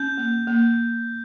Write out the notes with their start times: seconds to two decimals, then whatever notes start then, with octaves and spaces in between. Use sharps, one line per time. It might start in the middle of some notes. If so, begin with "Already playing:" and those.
Already playing: C#4 G6
0.18 A#3
0.47 A#3